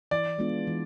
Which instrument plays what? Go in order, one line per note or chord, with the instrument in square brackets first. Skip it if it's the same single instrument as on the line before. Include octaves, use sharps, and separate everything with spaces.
[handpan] E3 [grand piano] D5
[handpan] G#3 B3 D4 F4
E3